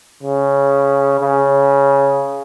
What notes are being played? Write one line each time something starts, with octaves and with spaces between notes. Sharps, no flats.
C#3
C#3